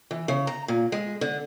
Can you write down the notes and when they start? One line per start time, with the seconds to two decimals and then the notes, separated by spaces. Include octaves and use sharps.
0.11 E3
0.28 C#3
0.47 A#5
0.68 A#2
0.92 G#3
1.21 D3